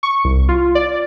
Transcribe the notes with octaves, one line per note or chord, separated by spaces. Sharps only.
C#6
C2
F4
D5